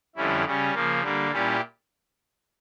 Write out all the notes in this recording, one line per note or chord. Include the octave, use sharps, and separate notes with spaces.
F2 D3 G3 C#4 E4
C#3 G3 C#4
C#3 F3 A#3
D3 G3 A#3
A#2 G3 C#4 E4 G4